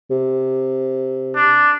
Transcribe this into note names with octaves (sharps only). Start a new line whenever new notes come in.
C3
D4